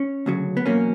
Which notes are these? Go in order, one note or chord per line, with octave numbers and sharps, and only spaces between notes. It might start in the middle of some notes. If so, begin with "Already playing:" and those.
Already playing: C#4
D2 C#3 F#3
B3
E2 B2 F#3 A#3 C#4